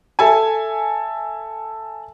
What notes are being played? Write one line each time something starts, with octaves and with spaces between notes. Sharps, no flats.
A4 E5 G#5